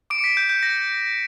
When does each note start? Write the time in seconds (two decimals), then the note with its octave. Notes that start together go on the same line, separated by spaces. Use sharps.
0.10 D6 D7
0.19 C#7
0.24 B6
0.37 G6
0.50 G6
0.63 A#6